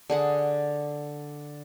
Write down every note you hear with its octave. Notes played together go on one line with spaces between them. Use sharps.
D3 G#4 F#5